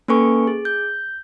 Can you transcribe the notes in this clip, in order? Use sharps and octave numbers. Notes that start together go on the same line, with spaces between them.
A#3 C#4 A4 B4 G#5 C#6
G#4
G6